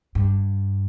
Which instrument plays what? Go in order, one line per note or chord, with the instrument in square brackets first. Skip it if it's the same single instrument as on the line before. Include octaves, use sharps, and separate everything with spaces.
[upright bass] G2